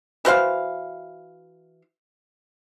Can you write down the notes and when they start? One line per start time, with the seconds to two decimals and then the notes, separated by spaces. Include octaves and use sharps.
0.25 E3 F#4 C5 F5